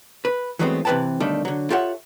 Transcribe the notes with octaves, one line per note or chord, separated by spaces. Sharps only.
B4
E3 F#3 G#3 A3 B3 C4
C3 E3 A#4 B4 G5 A5
B1 D3 D#3 G3 A3 A4
D3 F#3
F4 G4 A4 C#5 E5 F#5